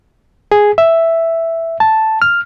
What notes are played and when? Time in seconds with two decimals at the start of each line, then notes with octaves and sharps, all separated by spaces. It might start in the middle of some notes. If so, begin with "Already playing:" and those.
0.52 G#4
0.78 E5
1.80 A5
2.22 F6